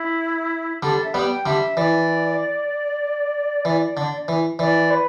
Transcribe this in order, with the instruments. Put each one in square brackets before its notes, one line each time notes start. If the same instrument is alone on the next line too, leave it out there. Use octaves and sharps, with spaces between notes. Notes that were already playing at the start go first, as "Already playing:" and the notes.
Already playing: [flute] E4
[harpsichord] D3 G3 [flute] A4
[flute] E5
[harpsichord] G3 B3 [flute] G5
[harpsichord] D3 G3 [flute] E5
[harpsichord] E3 [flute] D5
[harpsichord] E3
D3
E3
[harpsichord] E3 [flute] D5
[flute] B4